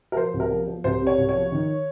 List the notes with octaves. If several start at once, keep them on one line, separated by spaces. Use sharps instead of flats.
A#4
F3 C5
C2
A#4
F3
F3
C2 C5
C3
C#5
C2
C#5
F3
D#3